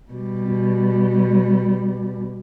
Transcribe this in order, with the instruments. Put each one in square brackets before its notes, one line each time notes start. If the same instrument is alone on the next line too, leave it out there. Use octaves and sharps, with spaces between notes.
[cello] B2 G3